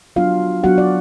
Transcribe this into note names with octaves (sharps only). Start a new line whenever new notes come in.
F#3 B3 D4 F4 F5
F#3 B3 D4 F#4 F#5
D5